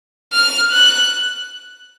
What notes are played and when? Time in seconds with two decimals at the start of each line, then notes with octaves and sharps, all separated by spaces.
0.33 F6
0.72 F#6